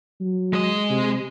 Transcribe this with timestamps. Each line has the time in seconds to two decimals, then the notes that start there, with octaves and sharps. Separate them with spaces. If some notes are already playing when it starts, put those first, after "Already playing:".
0.21 F#3
0.53 G#3 D#5
0.90 C3